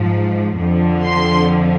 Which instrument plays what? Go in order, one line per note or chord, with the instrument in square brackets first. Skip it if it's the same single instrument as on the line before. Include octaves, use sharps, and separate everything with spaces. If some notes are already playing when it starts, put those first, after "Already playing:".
Already playing: [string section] G#2 F3
F2 D3 F3
C6